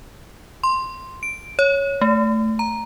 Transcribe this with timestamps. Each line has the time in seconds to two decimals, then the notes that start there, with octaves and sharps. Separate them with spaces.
0.63 C6
1.23 D7
1.59 C#5
2.01 A3
2.59 A#5